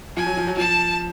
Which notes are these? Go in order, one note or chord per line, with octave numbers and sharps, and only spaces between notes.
F3 G#5
F#3
F3
F#3
F3 A5